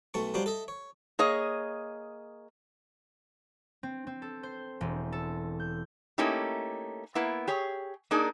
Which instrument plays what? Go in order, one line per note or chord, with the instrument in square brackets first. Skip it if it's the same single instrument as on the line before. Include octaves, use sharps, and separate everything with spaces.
[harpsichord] B1 A3 A5 C#6
F#3 G3 D4 F4 C5
A4 D#5 E5
C#5
[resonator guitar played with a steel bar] A#3 G#4 C#5 D#5
[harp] C4
C4
A4
C5
E1
A4
G6
[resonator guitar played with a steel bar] A3 A#3 C#4 D#4 E4 G4
A#3 B3 E4
G4 G#4 C#5
A#3 D4 D#4 G#4 A#4